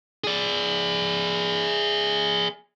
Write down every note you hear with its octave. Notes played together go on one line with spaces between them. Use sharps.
G#4 D5